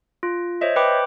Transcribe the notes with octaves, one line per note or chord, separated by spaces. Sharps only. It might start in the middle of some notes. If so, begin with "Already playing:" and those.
F4
C5 C#5 D#5 E5
B4 G5 B5 D6